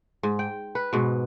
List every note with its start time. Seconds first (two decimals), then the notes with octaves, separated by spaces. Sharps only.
0.23 G#2
0.39 G5
0.75 B4
0.93 G#2 B2